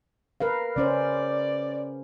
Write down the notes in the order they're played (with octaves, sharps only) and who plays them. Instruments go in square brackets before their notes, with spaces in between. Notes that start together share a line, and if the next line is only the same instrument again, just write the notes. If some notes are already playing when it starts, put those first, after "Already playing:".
[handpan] A#4 B4 F5
[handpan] C#3 C#4 C5 [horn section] D5